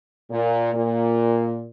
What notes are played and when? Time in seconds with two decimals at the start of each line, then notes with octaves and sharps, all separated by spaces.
0.31 A#2
0.74 A#2